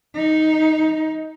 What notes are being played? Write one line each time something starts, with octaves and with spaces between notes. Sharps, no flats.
D#4